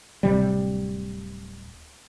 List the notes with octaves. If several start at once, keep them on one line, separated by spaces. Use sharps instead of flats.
D1 C3 G3